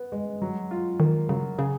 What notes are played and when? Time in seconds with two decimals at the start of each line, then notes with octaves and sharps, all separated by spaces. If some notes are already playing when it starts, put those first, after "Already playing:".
Already playing: B3
0.12 G#3
0.42 F#3
0.71 F4
1.00 D#3 A#3
1.29 C#3 F#3
1.58 C#3 G#4